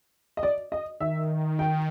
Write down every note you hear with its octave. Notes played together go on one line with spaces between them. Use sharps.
D#5
D5
D#5
D#3 E5
G5